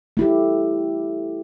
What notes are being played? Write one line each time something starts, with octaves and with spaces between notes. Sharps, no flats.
A3 E4 G4